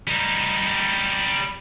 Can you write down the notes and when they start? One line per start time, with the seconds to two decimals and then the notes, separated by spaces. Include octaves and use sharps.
0.08 G3 D#4